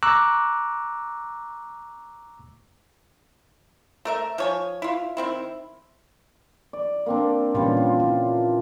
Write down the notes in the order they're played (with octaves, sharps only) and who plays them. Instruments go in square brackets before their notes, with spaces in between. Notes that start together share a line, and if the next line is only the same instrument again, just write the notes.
[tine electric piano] A#5 C#6 D6 E6 F#6
[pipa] A3 A#4 E5
F3 C#5 G#5
E4 F4
D#3 C4 E4
[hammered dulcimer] D5
A#3 C4 D4
[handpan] A#2 C#4 [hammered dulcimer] E3 G3 F4
[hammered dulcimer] F4
[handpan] E4